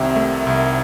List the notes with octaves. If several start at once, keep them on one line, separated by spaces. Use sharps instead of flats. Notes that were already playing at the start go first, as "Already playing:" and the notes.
Already playing: C2 C3 D#3 E5
A3
C2